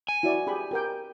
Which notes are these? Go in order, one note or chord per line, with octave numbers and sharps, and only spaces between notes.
G#5
E4 F#4 D5
G4 G#4 B5
G4 A#4 G5